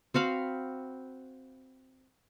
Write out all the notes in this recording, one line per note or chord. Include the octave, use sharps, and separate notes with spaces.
C4 F#4 F5 B5